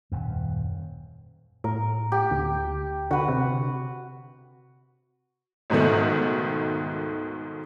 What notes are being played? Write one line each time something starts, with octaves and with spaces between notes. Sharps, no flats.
D#1 F#2
A2 A#4
G4
D2
D3 F#4 B4
C3
C#2 G#2 B2 D#3 A3